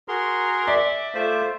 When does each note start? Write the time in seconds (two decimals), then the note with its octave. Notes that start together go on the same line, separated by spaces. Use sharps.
0.08 F#4 G#4 A#4 C6
0.67 D5 E5
1.15 A3 F4 C5 E5